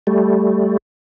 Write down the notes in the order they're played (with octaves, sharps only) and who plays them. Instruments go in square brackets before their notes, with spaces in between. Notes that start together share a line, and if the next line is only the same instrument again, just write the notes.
[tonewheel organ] G3 A3